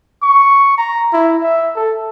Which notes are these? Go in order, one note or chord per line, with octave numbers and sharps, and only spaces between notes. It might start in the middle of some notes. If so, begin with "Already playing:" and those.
C#6
A#5
E4
E5
A4